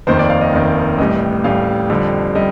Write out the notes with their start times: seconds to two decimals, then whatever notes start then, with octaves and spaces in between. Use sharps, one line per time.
0.07 F1 D#2 D#3 C5
0.19 D5
0.30 F5
0.41 D#5
0.53 F1 D#2 D#3
0.98 A1 A2 G3 D#5
1.44 A1 A2 G3 F5
1.90 F2 D3 G3
2.35 G3 D#5